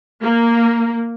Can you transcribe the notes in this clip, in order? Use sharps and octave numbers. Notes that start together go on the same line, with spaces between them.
A#3